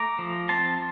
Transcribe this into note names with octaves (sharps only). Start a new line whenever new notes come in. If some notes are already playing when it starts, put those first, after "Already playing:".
Already playing: A3 A#5 D6
F3
C4 A5 C6